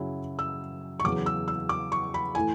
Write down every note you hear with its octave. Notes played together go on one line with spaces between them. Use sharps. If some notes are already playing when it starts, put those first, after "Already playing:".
Already playing: F#2 C#3 F#3 C#4 E4
E6
C#6
E2 C#3 F#3 D6
E6
E6
D6
C#6
B5
A2 E3 A3 G#5